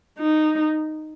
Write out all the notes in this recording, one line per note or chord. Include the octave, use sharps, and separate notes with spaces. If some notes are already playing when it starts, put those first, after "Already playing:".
D#4